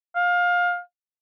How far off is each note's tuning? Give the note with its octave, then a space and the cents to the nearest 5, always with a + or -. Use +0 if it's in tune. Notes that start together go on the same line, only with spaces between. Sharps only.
F5 +20